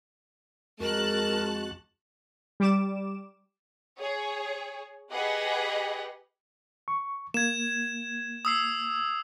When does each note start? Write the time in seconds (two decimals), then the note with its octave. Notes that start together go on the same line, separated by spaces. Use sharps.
0.80 F2 G#3 F#4 A#4 A5 F#6
2.60 G3 D6 E7
4.00 G#4 C#5
5.13 G4 G#4 B4 D#5 F#5
6.88 C#6
7.34 A#3 G#6 E7
8.45 D#6 E6 C7